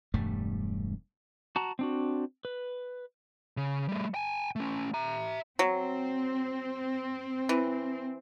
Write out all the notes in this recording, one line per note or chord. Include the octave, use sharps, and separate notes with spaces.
E1 G2 G3 A3
F#4 A5 A#5
C4 D4 F#4
B4
C#3
G3 A3
G5 G#5
A3 C#4
E5 A#5
F#3 C4
E3